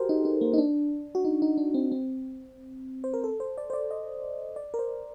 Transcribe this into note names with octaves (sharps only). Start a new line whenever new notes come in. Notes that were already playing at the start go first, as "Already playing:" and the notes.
Already playing: F#4 G4 A4 A#4 C5
D#4
D#4
A#3
D#4
D4
F#4
D#4
D#4
D4
C4
C4
C5
A#4
A4
C5
D5
C5
D5
D#5
D5
A#4
C5